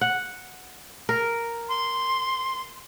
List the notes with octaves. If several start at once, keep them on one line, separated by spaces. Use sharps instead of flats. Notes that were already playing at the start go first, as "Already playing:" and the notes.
F#5
A#4
C6